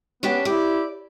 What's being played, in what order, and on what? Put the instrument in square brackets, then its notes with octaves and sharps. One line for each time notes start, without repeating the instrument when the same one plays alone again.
[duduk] B3 [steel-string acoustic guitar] C#4 D4 G4
[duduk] E4 [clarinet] G4 [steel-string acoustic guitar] D5